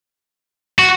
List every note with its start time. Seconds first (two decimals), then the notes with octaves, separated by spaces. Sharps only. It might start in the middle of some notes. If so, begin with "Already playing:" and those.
0.79 F#4